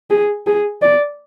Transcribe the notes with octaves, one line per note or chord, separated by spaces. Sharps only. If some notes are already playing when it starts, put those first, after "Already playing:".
G#4
G#4
D5